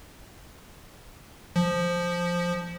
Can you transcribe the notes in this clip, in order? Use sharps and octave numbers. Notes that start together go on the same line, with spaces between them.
F3